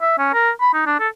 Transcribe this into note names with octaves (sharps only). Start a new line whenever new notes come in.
E5
C#4
A#4
B5
D#4
D4
A4